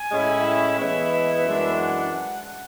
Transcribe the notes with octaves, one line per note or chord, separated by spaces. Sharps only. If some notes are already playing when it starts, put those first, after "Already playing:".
Already playing: G#5
A2 G#3 C#4 E4
E5
E3 G#3 B3 E4
E5
F#2 E3 G#3 D4
F#5